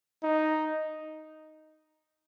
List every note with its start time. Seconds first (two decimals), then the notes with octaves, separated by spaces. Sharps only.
0.23 D#4